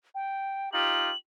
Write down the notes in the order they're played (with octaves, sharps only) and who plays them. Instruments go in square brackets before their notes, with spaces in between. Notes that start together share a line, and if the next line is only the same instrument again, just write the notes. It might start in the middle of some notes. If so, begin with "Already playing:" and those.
[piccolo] G5
[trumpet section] D#4 F4 G4 [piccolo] F#7